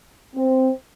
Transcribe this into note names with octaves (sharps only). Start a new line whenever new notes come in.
C4